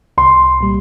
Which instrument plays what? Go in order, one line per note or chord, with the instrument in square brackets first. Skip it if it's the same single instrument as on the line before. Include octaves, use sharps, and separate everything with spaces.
[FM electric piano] C2 [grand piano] C6
[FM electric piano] A#2 G3